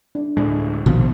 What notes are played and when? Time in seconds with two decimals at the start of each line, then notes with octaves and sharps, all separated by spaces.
0.15 D4
0.37 D2 A2 G#3 D4
0.86 A#1 B2 D#3 F3 B3